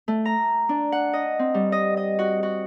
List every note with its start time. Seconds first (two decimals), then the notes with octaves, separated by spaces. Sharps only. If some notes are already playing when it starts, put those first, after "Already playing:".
0.08 A3
0.25 A#5
0.69 D4
0.92 F#5
1.13 D#5
1.39 C4
1.54 G3
1.72 D#5
1.97 D#5
2.19 F#4
2.43 F#4